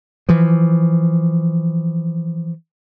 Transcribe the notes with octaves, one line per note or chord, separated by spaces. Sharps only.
E3 F3